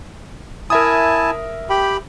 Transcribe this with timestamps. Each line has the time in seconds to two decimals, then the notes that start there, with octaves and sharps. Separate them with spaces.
0.70 E4 A#4 E5 G#5 A5 D#6
1.70 G4 G5 B5